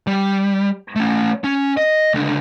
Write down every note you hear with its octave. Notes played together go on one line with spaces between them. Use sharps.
G3
A3 C#4
C#4
D#5
C#2 D3